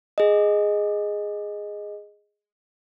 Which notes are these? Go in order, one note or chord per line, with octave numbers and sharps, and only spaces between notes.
G#4 D#5